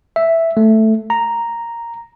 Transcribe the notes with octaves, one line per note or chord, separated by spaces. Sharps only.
E5
A3
A#5